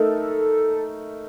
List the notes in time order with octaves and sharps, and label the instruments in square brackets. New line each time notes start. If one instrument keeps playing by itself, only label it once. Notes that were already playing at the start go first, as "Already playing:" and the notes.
Already playing: [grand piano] A3 D#4 A#4 [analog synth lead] A4